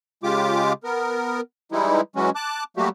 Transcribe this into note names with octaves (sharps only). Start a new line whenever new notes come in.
C#3 G#3 F4 G4 D6
B3 A#4
E3 G3 G#3 D#4 E4
E3 F#3 G#3 C#4 F#4
A5 D6 F#6
F#3 G3 A3 A#3 F#4 G4